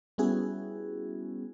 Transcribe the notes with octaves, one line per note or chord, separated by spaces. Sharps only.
G3 B3 C#4 E4 F#4 G#4